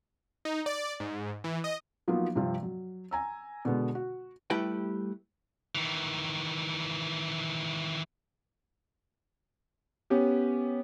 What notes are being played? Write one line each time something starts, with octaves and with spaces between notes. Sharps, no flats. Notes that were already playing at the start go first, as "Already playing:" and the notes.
D#4
D5
G#2
E3
D#5
F3 F#3 A#3 B3 D#4 F4
G2 C3 F3 C4 F4
F#3
G#5 A#5 E6
B2 D3 G#3 B3
F#4
G3 A3 E4 G4 B4 G5
D#3 E3
B3 C#4 G4